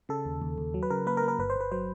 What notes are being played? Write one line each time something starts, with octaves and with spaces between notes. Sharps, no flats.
C#3 A4
D#2
D#2
D#2
F#3
B4
C#3 A#4
A#3 B4
A#4
A#3
A#4
G1 B4
C5
G1 B4
F#3 C5